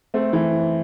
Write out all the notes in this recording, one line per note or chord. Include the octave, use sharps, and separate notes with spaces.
A3 C4
E3